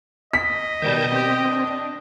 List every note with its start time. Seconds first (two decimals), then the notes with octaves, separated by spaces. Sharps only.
0.33 D#5 B6
0.82 B2 D#3 G3 A5 G6
1.12 C4 G4
1.49 D4